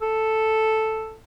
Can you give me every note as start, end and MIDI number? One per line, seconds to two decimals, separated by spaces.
0.02 1.15 69